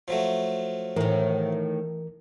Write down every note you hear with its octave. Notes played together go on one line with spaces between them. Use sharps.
F3 F#3 A3
A2 D#3 E3 A#4